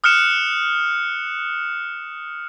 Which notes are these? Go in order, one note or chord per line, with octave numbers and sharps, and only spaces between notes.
D#6 F6 F#6 C#7 E7